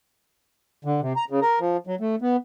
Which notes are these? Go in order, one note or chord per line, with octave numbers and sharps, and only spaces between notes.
D3
C3
A#5
C#3
A#4
F3
F#3
A3
B3